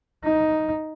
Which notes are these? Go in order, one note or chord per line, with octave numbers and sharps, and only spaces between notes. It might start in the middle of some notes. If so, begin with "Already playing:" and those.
D#4